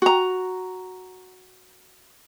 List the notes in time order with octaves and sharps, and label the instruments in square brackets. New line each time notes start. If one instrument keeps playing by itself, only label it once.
[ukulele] F#4 A#5